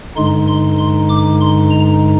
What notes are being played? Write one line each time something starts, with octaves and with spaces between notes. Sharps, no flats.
G2 D3 G#3 D#4 C6
C6
C6
D6
C6
A#5